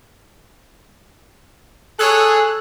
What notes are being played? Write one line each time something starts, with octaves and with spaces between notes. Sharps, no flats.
G#4 A4 C#5 G#5 E6 F#6